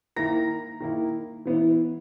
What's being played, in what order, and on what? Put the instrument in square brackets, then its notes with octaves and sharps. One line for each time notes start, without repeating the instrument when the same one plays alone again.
[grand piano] D#3 A#3 E4 A#5 A#6
D#3 A#3 E4
E3 B3 E4